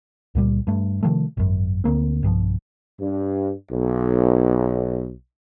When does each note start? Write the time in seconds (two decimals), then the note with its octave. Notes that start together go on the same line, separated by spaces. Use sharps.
0.35 C#2 A#2 G3
0.67 G2 A3
1.03 C3 D#3 F3 A3
1.37 G#1 F#2
1.84 D2 A#3 C4
2.23 B1 G2 D#3 F3
3.00 G2
3.71 B1